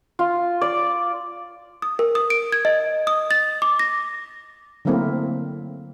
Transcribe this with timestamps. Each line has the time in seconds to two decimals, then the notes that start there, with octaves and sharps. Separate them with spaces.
0.19 F4
0.61 D5
1.82 D#6
1.99 A#4
2.15 D#6
2.30 D7
2.52 G#6
2.65 D#5
3.07 D#6
3.31 A6
3.62 D6
3.79 A#6
4.85 D3 F#3 A3 A#3 C4 E4